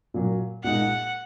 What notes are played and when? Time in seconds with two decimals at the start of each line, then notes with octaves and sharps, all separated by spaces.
0.14 A#2 F#3 A#3
0.64 A#2 G#3 D#4 F#5